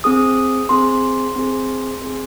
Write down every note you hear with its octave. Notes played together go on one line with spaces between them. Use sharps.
C4 G#4 D#6
C4 G#4 C6
C4 G#4
C4 G#4